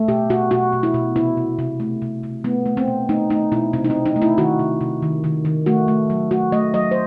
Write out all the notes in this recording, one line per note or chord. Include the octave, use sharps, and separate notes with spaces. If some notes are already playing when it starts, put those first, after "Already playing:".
Already playing: A3
B2 G4
B2 F#4
B2 F#4
B2
E4
B2
C3 E4
C3
C3
A3
C3
C3
A3 B3
A3
C4
B2
A3 D#4
A3 D#4
B2 E4
C3 C4
D#4
C4
C3
D#4
A3
E4
D#3 F#4
C3
C3
D#3
D#3
D#3
A3 F#4
A3
F#3
A3 F#4
A3 D#5
F#3 D#5
C5